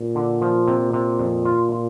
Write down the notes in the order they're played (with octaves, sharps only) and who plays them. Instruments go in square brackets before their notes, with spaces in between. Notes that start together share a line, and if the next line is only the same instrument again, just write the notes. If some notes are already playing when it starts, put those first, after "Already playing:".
Already playing: [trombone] A#2
[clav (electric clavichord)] D3
F3
C3
C3
F2
F4
F4